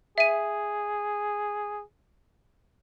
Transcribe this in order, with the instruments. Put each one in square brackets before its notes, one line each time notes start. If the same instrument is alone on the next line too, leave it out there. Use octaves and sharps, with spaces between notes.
[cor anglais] G#4 [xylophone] E5 D#7